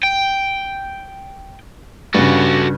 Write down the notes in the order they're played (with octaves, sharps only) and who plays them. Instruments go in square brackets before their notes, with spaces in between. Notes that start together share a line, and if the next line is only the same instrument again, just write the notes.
[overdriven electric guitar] G5
[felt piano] G2 C#3 [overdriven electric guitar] F#4 A4